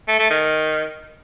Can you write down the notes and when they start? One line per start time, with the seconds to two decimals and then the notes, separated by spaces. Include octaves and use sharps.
0.08 A3
0.19 A3
0.30 D#3